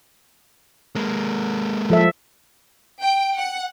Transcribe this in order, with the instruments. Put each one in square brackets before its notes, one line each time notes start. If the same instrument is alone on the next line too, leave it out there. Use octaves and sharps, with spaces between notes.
[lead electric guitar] G#3 A#3
[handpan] F3 A4 E5
[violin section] G5
F#5